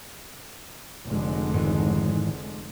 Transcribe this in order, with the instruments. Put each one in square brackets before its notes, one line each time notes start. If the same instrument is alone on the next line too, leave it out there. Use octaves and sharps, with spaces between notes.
[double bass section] F1 D3 G#3
[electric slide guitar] G#2 D#3 E3